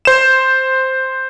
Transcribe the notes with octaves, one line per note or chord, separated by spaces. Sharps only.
C5 E7